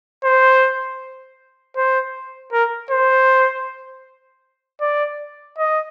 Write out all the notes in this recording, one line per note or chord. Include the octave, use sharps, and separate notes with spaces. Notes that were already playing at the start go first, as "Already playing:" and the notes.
C5
C5
A#4
C5
D5
D#5